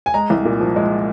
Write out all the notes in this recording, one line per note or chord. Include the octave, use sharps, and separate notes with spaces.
G#5
G#3 A#5
C2
A#2
F3
G#3